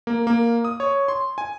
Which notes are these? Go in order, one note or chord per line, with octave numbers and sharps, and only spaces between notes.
A#3
A#3
D#6
C#5
C6
G#5